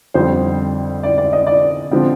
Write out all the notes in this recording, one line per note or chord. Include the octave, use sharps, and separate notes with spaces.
F2 D3 G3 C4 C5
D5
D5
D#5
D5
D3 F3 C4